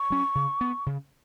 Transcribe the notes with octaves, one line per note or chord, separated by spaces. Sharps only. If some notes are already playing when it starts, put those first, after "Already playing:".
Already playing: C#6
F#3 C#4
C#3
B3
C#3